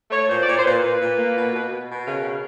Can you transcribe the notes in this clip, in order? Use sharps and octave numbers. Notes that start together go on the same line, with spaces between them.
A3 C#5
A#2 C5
D5
A#2 C#5
C5
A#2 B4
A#2
A#2
A#3
B2
B2
B2
B2
C#3 A#4
C#3